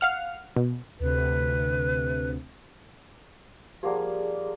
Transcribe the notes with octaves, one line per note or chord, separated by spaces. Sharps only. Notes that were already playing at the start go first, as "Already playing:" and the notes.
F5 F#5 F6
B2
D2 C3 B4
F3 G3 A#3 G4 G#4 D5 F#5